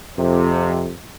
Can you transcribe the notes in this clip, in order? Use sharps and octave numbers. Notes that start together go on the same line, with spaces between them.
F2 C3